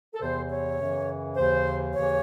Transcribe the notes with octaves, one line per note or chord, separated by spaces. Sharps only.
A4
E2 C3 E3 C5
C#5
F#2 C#3 E3
D#2 C#3 E3 C5
D#2 C#3 E3 C#5